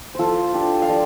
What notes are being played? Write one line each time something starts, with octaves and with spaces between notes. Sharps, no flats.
F3 F4 A4 C5
D4 F4 G4 C5
F5
F3 A4 D5